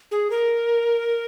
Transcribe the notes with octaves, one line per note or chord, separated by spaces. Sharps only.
G#4
A#4